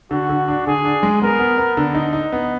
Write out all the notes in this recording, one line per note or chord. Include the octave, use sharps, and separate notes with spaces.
D3 F#4
D3
D4
D3 G#4
D4
G#3
B3 A#4
B3
B3
D3
D#4
D#4
B3